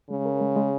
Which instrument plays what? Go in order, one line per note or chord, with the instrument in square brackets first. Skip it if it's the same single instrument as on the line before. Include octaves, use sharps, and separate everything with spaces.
[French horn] C#3 [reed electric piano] G#3
[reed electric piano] A#4
G#3
G#3